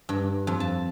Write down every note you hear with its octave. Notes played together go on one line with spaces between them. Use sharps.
G2
F2
A5